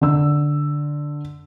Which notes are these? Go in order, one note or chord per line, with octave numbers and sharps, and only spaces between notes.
D3 E6